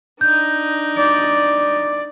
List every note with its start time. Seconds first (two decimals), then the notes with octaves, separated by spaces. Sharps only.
0.21 D4 D#4 G6
0.98 D5